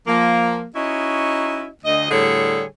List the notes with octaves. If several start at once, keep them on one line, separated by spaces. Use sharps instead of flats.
F3 A#3
C#4 D#4 E4 F#4 D#5
D2 D#5
A2 D3 G3 G#4 A4 C#5